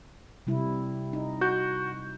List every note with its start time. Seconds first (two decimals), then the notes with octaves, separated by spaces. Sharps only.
0.47 C3 G3 E4
1.13 D#4
1.41 F#4 G6